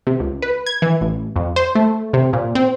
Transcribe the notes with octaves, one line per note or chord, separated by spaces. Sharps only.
C3
C#2
B4
G#6
E3
A1
F2
C5
A3
C3
A#2
C4